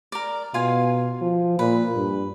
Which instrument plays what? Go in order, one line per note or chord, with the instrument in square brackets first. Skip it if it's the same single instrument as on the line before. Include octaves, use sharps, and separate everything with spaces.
[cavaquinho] A#4 D5
[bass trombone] B2 [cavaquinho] F4 F5 G#5
[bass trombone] F3
[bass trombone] A#2 [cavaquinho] B4
[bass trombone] G2